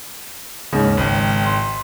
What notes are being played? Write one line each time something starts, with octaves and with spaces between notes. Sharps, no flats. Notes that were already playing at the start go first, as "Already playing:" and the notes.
D#2 G#2 C#3
G#1
C6